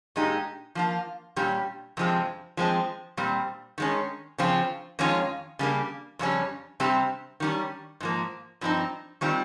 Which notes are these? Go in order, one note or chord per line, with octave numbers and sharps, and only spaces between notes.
A#2 G#3 D#4 G4
F3 A#3 F4
A#2 G3 C#4 G4
F2 C3 F3 G#3 C4
F3 G#3 C4
A#2 G3 C4
D#3 G#3 C#4
C#3 F3 C4 F4
F2 D#3 G#3 C#4 F4
C#3 G3 A#3
F2 C#3 G3 C#4
C3 G3 C4 G4
D#3 G3 C#4
G#2 F3 A#3
G2 F3 C4 D#4
D#3 G3 C4 F4